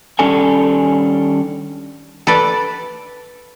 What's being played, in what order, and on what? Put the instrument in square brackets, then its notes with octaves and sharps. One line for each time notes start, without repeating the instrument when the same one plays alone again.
[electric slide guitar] D#3 G3 C#4 D4 A4 G#5
[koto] A4 B4 D5